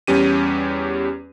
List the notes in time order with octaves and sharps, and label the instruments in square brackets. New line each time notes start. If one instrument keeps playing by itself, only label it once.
[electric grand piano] E2 G3 C#4 G4 D#7